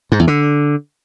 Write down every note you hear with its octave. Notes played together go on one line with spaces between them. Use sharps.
G#2
E2
D3